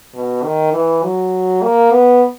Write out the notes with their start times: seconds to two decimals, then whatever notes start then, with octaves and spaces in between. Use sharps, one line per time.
0.14 B2
0.44 D#3
0.73 E3
1.02 F#3
1.63 A#3
1.91 B3